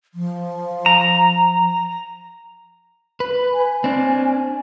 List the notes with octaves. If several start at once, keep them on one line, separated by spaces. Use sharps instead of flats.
F3
A#5
B4
G#5
C4 D4